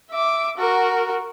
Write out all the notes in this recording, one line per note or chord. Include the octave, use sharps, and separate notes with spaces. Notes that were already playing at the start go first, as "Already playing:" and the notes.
E5 D6
F#4 A#4